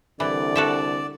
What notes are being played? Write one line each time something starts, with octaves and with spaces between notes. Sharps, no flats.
C2 D3 E3 D5
F#4 A4 E5